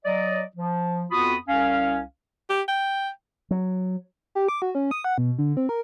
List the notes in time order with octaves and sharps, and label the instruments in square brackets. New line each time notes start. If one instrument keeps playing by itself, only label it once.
[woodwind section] F#3 D5 D#5
F3
F2 B3 F4 F#4 B5 D#6
C2 C#4 F5
[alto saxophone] G4
G5
[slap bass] F#3
[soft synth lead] G4
D6
F#4
C#4
D#6
F#5
B2
D3
C4
A#4